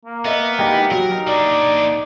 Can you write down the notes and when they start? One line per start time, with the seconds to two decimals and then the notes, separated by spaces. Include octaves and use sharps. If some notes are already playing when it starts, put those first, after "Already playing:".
0.05 A#3
0.25 B3 D#5 E5
0.59 G#3 D#4 E4 G4
0.91 F#3 A#4
1.12 D#4 A#5
1.27 A#3 D4 D5